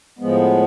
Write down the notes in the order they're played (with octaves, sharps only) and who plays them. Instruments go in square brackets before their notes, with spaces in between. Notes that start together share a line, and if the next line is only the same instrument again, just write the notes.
[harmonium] A2 F3 G#3 B3